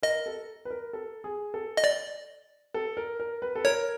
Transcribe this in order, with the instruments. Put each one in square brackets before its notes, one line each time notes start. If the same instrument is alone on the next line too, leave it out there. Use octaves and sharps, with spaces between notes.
[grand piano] A#4 [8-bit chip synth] D#5
[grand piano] A4
B4
A#4
A4
G#4
A4
[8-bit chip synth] D#5
D5
[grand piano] A4
A#4
A#4
B4
A4
[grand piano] A#4 [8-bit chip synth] C#5